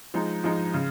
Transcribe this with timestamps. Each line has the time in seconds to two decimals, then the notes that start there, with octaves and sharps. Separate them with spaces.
0.14 F3 G#3 D#4
0.44 F3 G#3 D#4
0.74 C#3